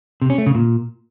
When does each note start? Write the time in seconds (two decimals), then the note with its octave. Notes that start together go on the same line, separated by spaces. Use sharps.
0.22 C3
0.30 C#4
0.38 A3
0.46 C#3
0.55 A#2